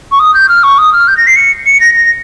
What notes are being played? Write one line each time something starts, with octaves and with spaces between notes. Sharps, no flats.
C#6
D#6
G6
F6
C#6
D#6
F6
G6
A#6
C7
C#7
C#7
A#6
A#6